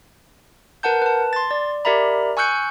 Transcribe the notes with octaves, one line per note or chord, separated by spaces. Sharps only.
A#4 B4 F#5 A5 G6
B4 A5
C6 A6
D5
G4 A#4 D5 E5 A#5 B5
G#5 C#6 E6 F#6 G6 C#7